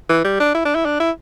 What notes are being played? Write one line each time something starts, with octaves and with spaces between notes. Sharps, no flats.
E3
G3
D4
E4
D4
E4
D4
E4